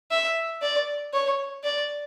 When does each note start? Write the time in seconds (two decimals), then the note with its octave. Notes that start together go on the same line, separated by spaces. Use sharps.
0.11 E5
0.62 D5
1.13 C#5
1.64 D5